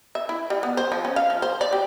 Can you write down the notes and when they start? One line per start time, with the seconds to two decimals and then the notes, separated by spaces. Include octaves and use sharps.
0.15 E5
0.29 E4
0.50 G3
0.63 B3
0.77 C5
0.92 F3
1.05 C#4
1.16 F5
1.30 F3
1.42 C5
1.61 D5
1.73 G4